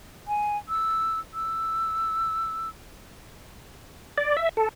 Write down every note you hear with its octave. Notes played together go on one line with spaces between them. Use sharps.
G#5
E6
E6
D5
E5
A4